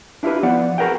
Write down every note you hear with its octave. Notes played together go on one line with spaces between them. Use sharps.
D4 E4 F4 G4 B4
F3 B3 D5 F#5
F#4 G#4 A#4 B4 F#5 G5